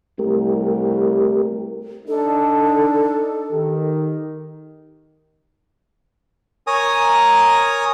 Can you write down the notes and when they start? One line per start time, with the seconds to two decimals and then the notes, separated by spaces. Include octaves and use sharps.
0.19 C2 A3 G4 A#4
2.08 D4 D#4 A4
3.50 D#3 G4
6.67 A#4 C#5 G#5 A#5 D#6